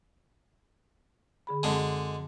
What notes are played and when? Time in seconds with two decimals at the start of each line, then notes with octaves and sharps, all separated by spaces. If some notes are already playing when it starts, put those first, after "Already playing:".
1.47 D3 G#4 B5
1.63 F#2 D3 G#3 C4 D#5